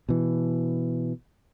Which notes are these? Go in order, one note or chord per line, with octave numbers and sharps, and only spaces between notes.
B2 E3